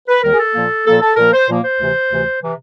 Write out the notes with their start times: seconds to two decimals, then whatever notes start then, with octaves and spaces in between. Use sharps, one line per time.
0.08 B4
0.23 D#2 D#3 G3 A#4
0.33 G#4
0.39 A4
0.55 A#2 F3 A#3
0.86 A#2 F3 A#3 A4
1.01 A4
1.16 A#2 F3 A#3 A#4
1.33 C5
1.48 A#2 F3 A#3
1.64 C5
1.79 D2 C3 E3
2.11 D2 C3 E3
2.42 C3 E3